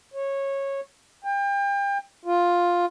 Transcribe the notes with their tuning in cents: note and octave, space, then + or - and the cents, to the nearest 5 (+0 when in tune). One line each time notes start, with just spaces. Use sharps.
C#5 -15
G5 +35
F4 +5